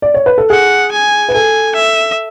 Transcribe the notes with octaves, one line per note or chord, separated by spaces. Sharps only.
D5
C#5
B4
A4
G#4 F#5
G#5
B4
A4 G#5
E5